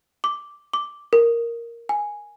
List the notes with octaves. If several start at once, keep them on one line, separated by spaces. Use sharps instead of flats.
D6
D6
A#4
G#5